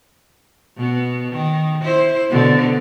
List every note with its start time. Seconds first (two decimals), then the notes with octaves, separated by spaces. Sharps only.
0.76 B2 B3
1.32 D#3
1.82 E4 C5
2.30 B2 D3